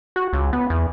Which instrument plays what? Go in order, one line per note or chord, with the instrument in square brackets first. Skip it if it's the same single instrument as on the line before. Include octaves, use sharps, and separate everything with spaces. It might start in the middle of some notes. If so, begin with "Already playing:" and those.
[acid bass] F#4
C#2
B3
E2